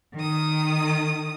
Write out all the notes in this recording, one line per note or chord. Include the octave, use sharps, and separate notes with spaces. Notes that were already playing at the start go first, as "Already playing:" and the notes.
D#3 D#6